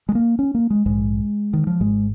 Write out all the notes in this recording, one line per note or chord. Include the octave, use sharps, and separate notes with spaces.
G#3
A#3
C#4
A#3
G#3
A#1 G#2 G#3
D#3
F3
G#1 G#2 G#3